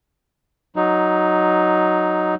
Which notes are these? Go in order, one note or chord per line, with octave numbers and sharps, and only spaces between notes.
F#3 D#4